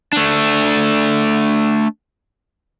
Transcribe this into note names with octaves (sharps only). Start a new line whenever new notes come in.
A3 D4